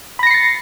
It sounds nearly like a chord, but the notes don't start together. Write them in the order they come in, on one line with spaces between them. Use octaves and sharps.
B5 A#6 C#7 C7 A6